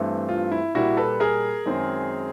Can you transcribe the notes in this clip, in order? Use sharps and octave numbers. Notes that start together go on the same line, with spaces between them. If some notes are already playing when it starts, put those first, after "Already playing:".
Already playing: G2 E3 A3 C4
F4
E4
A#2 G3 A#3 E4 F#4
A4 B4
G#4 A#4
F#2 D#3 G#3 C4